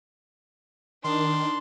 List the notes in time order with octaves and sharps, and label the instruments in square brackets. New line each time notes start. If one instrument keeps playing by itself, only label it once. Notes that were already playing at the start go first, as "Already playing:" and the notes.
[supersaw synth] D#3 [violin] D4 [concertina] C6